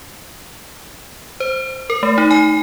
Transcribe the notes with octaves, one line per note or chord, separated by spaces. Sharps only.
C5
A#4
A3
D#4
G#5